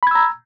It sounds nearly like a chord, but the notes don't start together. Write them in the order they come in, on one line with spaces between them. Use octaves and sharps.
B5 G#6 E6 A#5